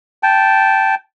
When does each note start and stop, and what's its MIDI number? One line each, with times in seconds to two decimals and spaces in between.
0.23 0.95 79
0.23 0.95 81